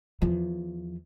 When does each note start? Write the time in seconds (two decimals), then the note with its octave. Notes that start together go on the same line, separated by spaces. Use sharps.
0.22 E2 F3